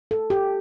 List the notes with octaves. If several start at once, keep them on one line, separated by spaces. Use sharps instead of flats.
A4
G4